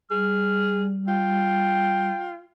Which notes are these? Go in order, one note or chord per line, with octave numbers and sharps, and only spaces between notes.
G3 G#4 F6
F4 G5